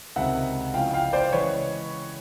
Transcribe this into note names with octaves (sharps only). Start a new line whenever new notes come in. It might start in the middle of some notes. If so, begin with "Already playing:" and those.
C#2 C3 D#3 G#3 C4 E5 F#5
C#3 F3 G#3 C#4 E4 F5 G5
F5 G5
C5 D5
C#3 E3 G#3 B4 C#5